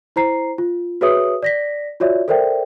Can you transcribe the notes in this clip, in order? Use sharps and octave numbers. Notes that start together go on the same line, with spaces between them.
E4 C5 A#5 C7
F4
F#4 G#4 B4 C#5 E5 D#6
D5 A#6 B6
F4 F#4 C#5 D5 E5
A4 A#4 C5 D5 E5 G5